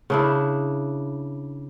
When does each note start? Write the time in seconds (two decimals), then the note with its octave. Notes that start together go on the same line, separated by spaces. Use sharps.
0.10 C#3 D4 E4